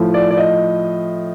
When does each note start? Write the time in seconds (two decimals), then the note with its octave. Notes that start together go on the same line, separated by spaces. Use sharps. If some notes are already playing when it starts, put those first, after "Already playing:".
Already playing: A2 F3
0.14 D5
0.30 D5
0.37 D#5